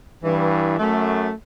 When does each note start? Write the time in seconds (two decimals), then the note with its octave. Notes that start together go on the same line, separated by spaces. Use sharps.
0.24 G2 E3
0.79 F#2 A3